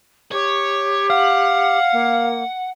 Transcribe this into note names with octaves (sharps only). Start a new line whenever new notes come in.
G4 C#5
F5 F#5
A#3